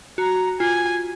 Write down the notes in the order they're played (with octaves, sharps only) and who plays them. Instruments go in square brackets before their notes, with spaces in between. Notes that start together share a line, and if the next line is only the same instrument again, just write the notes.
[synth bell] F#4 [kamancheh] A#5
[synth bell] F4 [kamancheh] G#5